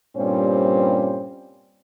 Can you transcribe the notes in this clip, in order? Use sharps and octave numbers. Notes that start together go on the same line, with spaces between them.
G2 A#2 G3 C4 C#4 C5